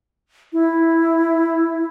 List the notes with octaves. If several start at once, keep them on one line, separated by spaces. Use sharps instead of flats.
E4